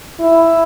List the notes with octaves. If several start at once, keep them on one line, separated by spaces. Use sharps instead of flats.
E4